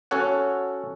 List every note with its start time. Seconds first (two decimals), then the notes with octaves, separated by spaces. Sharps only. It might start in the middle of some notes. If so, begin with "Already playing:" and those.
0.11 C#4 F#4 A4 C#5 F#5